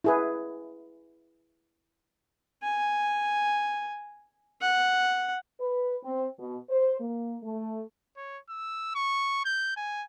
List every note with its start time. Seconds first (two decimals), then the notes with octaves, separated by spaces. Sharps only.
0.04 E4 G#4 B4
2.63 G#5
4.61 F#5
5.60 B4
6.04 C4
6.39 B2
6.69 C5
7.00 A#3
7.43 A3
8.17 C#5
8.49 E6
8.95 C#6
9.45 G6
9.76 G#5